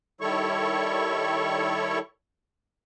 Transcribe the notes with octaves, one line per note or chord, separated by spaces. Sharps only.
D#3 G3 E4 A4 C#5 C#6